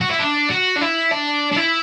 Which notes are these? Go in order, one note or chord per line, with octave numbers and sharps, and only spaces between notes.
F#4
E4
D4
F#4
D4
E4
D4
D4
E4